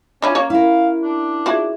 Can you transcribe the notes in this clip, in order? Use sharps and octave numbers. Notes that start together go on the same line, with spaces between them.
C#4 D4 E4 F4
A#3 C#4 C#5
E4 A#4 F5
D4
F4 F#4 G#4 D5 E5